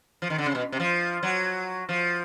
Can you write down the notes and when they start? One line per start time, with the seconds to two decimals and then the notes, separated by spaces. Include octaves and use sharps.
0.22 F3
0.30 D#3
0.38 D3
0.46 C#3
0.55 B2
0.72 C3
0.80 F3
1.23 F#3
1.89 F3